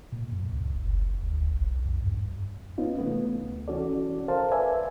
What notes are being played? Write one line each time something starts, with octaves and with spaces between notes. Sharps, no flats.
A#2
F#2
C#2
F#1
D2
E1
B1
F2
G2
B3 C#4 D#4 F4
C3 E3 A3 B3
D2
E3 C#4 F#4 A4 D5
A4 A#4 C5 F5 A5
B4 D5 E5 G#5